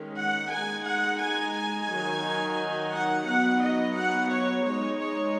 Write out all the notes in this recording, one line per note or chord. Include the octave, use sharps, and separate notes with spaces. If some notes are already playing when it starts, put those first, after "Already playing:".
Already playing: D#3 G#3 C#4
F#5
G#3 D#4 G#5
F#5
G#5
G#5
D#3 F#3 D#4
F#5
F#3 B3 D#4 F#5
D#5
F#5
C#5
G#3 D#4 C#5
C#5